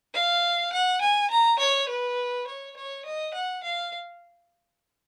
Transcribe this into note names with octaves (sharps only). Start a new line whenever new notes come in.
F5
F#5
G#5
A#5
C#5
B4
C#5
C#5
D#5
F#5
F5